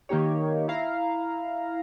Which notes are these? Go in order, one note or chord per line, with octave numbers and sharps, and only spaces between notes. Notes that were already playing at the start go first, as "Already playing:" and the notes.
D#3 A#3 D#4 G4 C#5
E4 F5 A#5